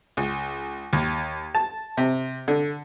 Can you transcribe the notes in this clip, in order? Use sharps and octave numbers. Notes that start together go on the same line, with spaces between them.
C#2
D#2
A5
C3
D3